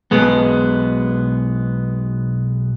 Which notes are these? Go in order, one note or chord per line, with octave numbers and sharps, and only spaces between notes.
B1 B2 G#3 B3